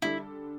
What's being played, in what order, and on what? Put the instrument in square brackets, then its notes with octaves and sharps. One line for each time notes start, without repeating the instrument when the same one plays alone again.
[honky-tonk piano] D3 G3 D4 A4 [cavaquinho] E4